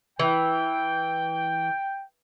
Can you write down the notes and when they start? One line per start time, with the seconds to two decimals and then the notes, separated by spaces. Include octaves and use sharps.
0.20 E3 G5